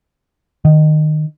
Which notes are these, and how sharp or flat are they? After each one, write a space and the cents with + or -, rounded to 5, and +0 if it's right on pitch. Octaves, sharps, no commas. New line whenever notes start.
D#3 -20